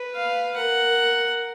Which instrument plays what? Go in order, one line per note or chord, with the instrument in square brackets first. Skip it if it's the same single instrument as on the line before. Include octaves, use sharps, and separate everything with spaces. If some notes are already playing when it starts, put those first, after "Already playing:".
Already playing: [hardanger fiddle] B4
[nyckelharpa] F5
[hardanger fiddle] A#4 [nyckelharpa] F#5